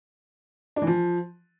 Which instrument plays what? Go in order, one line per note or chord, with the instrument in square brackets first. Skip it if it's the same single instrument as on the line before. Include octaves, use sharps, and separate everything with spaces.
[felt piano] D4
E3
F3